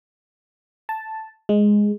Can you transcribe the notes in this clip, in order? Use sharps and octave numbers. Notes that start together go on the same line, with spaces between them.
A5
G#3